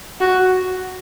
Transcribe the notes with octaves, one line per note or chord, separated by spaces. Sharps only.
F#4